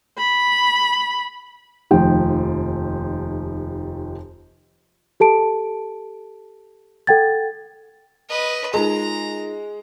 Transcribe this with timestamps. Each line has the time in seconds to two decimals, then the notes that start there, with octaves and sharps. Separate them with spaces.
0.18 B5
1.91 F1 D#2 F3 G5
5.20 G4 A4 A5 D7
7.07 A4 F#5 G5 G#6 A6
8.29 B4 D#5
8.74 G#3 D#4 F4 A#4 A#5